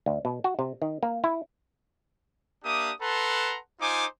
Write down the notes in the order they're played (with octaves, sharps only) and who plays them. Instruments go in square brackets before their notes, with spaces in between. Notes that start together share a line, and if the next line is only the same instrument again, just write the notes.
[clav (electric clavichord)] D2
B2
F#4
C3
D#3
A#3
E4
[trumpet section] A#3 D4 G4 E5 D#6
A4 B4 F#5 A5 A#5 C6
D#4 F4 C5 G#5 D6